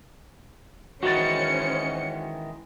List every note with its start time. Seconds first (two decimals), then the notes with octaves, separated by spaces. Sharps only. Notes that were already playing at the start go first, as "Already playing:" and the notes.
1.03 D#3 E3 G#3 C#4 F#4 C5 A6 C#7